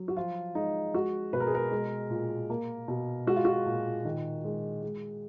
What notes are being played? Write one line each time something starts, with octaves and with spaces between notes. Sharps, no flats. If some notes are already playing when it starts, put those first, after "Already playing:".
Already playing: F#3
F#4
F3 F4
G#3 D#4
G#3 F#4
B2 B4
A#4
G#4
A#4
G#3
A#2
A#3
B2
G#3 F#4
F4
F#4
A#2
D#3
G#3
G#3